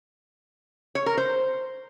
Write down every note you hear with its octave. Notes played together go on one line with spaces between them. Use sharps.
C#5
A#4
C5